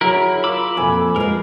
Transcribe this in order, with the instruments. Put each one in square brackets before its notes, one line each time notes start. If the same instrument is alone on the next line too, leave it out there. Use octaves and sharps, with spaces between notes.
[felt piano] F#3 G#4 C#5 [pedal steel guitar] E4 A#4
[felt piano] F4 A#4 [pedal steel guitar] B5 D6 E6
[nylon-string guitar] F2 [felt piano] A#2 A4 G#5
[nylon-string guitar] F3 G#3 [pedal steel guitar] A#4 [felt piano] B4